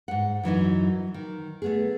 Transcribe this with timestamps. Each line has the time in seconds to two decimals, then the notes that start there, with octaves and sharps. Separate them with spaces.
0.08 G#2 F#5
0.43 F#2 E3 F#3 D#4
1.14 D#3
1.62 A3 B3 G#4